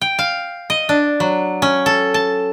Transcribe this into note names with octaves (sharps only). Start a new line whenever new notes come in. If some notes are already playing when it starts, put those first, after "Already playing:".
G5
F5
D#5
D4
F#3
C#4
A4
A5